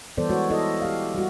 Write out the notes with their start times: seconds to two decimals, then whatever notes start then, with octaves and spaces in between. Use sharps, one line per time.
0.17 E3 G3 B3 A4 C5 D5
0.30 G#3 F#4 C#5
0.50 E4 A4 D#5
0.82 G4 F5
1.14 G3 F#4